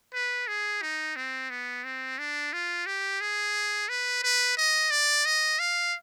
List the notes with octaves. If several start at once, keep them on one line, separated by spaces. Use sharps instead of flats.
B4
G#4
D#4
C4
B3
C4
D4
F4
G4
G#4
B4
B4
D#5
D5
D#5
F5